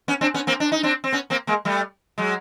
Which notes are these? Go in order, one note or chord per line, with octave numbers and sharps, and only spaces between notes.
B3 C#4
C4 D4
B3 C#4
A#3 C4
D4
D#4
C4 D4
C4
B3 C#4
A#3 C4
G#3 A#3
G3 A3
F#3 G#3